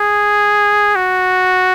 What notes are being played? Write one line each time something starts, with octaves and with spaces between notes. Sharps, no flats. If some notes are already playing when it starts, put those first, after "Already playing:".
Already playing: G#4
F#4